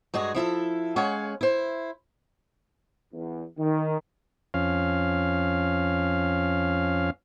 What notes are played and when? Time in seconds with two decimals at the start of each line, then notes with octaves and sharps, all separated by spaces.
0.14 G2 G#3 F#4 G#4
0.35 F3 E4 A4 E5
0.96 G#3 C#4 C#5 F5 F#5 G#5
1.41 E4 C5
3.13 E2
3.59 D#3
4.54 F2 C#4 F5